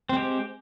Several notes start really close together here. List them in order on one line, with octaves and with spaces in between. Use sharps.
C4 G#3 G4